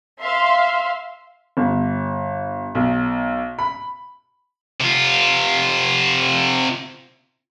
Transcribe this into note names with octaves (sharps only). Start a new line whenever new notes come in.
E5 F5 C6
G1
B1
B5
C3 F4